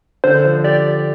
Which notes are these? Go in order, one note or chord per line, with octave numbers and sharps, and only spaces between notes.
D3 C5
D3
F3
G4 D5